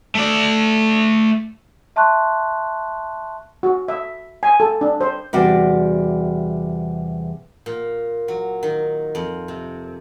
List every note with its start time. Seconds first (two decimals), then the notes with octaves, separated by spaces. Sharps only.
0.15 A3 D5
1.96 E5 A5 C6 C#6 F#6
3.63 F#4
3.88 E5
4.43 G#5
4.60 A4
4.81 D4
5.01 C5
5.33 E2 C3 G3 F#4 G4 D5
7.66 A#2
8.28 F#3
8.63 D#3
9.15 F2
9.48 C3